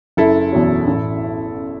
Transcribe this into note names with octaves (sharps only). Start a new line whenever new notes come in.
F#1 E4 A4
E2 B2 F#3
A1